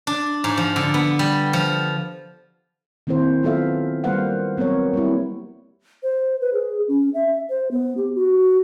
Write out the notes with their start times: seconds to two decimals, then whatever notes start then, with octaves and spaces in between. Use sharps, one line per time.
0.07 D4
0.44 G#2
0.58 F3
0.76 D3
0.94 B3
1.19 G3
1.53 F3
3.07 D#3 A#3 C4 E4 C5
3.43 F#3 B3 F4 A4 E5 F5
4.04 G3 A#3 B4 C5 F5 F#5
4.57 F#3 B3 C4 A#4 C#5
4.94 G3 A#3 C4 E4
6.03 C5
6.41 B4
6.54 G#4
6.88 C#4
7.14 E5
7.50 C5
7.71 B3
7.97 G4
8.16 F#4